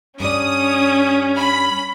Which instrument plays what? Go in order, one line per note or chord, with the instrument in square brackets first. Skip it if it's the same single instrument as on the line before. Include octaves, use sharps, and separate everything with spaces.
[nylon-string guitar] G2 D5 [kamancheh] C#4 [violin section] D#6
[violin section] B5